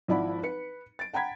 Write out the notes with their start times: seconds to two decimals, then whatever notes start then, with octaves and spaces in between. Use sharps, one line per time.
0.08 G#1 F3 E4 D5 F#5 B5
0.43 B4 C#7
0.99 A6 D7
1.13 F#5 G5 A#5 B5 G#6 B6